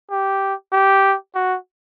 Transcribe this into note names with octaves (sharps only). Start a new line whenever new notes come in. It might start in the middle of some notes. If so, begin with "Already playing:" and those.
G4
G4
F#4